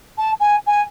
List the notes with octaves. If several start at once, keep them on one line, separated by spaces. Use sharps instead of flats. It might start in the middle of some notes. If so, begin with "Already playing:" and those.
A5
G#5
G#5